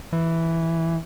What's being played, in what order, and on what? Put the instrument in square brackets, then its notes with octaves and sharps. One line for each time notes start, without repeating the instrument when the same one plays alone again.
[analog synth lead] E3